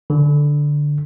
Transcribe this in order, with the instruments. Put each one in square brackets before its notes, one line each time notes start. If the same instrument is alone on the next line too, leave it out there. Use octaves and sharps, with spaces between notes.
[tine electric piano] D3